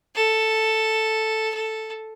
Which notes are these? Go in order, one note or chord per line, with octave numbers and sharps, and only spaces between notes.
A4
A4